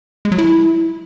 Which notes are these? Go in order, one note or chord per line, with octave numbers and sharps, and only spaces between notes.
G#3
F#3
E4